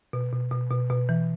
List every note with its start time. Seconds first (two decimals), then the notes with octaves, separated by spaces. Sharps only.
0.13 B2
0.33 B2
0.51 B2
0.71 B2
0.90 B2
1.09 E3